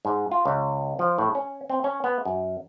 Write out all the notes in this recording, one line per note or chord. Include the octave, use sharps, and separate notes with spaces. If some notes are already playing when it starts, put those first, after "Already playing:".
G#2
F4
C#2
F3
A2
C#4
C4
C#4
B3
F#2